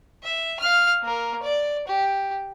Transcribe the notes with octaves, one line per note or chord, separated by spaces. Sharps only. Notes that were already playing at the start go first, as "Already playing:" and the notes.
E5
F5 F6
A#3 A#4
D5
G4